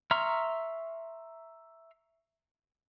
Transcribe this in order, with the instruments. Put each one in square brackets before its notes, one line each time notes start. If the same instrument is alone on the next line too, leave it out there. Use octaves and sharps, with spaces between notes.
[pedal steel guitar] E5 A#5 C6 C#6 F6